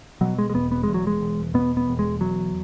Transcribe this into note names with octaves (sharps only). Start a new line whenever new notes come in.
B2 F#3
G#3
G#3
E1 B3
B3
G#3
E2
F#3
G#3
E1
B2 B3
B3
E1
G#3
E2 F#3